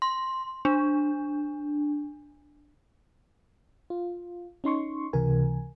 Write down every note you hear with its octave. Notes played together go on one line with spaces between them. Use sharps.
C6
D4
F4
C#4 D#4 C6 C#6
C#2 C3 E3 A#4 G#5